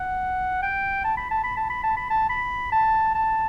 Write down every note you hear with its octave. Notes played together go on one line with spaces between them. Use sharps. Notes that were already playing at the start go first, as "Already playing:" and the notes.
Already playing: F#5
G5
A5
B5
A5
B5
A5
B5
A5
B5
A5
B5
A5
A5